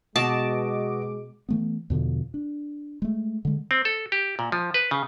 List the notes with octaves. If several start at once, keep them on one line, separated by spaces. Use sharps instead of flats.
B2 G#3 F#4 D#5 A5 D6
E3 A3 B3
E2 B2 D3 F3
D4
G#3 A3
D3 G#3
C4
A4
G4
A#2
F3
B4
C#3